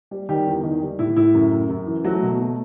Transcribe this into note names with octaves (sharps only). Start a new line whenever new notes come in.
G3
D#3 G3 G4
E2
D#3
G3
A2 E4
A2 E4
F#2
F#2
F#2
E3
F#3 A3 F#4
B2
A3